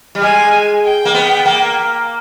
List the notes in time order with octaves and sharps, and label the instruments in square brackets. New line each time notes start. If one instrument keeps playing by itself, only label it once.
[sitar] G3
[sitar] G#3 [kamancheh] G#5
[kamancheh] G5
[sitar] A#3
B3
A#3